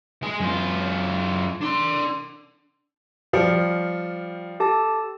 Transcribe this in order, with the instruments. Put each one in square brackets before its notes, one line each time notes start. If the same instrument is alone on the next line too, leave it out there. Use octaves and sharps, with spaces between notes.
[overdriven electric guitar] G#3 G#4
F#2 F4
D4 C6
[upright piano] F3 G3 [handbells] F5 C#7 D7
[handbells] G4 A4 A5